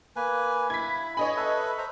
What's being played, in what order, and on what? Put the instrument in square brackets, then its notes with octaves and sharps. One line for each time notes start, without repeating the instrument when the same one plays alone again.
[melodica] A#3 B4 G#5
[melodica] E4 [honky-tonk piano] G#6 B6
[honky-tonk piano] C#5 D#5 B5 [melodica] G#5
[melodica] A4 B4 E5
C5 E5 A#5